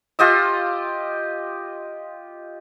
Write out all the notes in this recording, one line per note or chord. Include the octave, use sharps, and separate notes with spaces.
F4 G4 D#5 E6